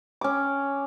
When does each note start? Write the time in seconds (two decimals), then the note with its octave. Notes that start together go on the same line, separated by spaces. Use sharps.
0.21 C#4 D6